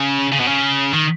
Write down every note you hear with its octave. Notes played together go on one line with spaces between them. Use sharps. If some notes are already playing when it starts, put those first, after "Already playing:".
Already playing: C#3
C#3
B2
C#3
D#3